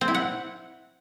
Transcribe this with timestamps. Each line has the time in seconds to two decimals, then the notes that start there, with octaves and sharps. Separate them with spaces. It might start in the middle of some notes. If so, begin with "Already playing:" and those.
0.01 C4
0.08 E4
0.14 F#5